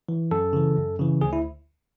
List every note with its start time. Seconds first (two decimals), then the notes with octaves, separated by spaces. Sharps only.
0.09 E3
0.31 F#2 A4
0.53 C#3 E3
0.77 F#2
0.99 C#3 E3
1.21 D2 G#4
1.33 E4